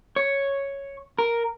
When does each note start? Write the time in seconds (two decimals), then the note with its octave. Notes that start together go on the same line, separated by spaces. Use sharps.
0.16 C#5
1.19 A#4